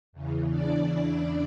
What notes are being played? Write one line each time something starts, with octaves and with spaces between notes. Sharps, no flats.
E2 C#3 E3
D4 D5
D4 D5